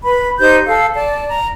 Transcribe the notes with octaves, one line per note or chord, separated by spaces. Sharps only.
B4 B5
D#4 G4 C5 G6
A4 F5 E6
D5 A5
A#5